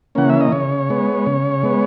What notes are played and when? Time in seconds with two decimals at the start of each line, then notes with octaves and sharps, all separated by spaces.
0.15 C#3 E3 A#3 C#4 F#5
0.30 E5
0.41 D#5
0.52 C#3 C#5
0.90 G#3 B3
1.26 C#3
1.63 G#3 B3